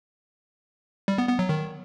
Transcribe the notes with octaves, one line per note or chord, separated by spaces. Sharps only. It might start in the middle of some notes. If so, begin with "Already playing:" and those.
G3
B3
B3
F#3
D#3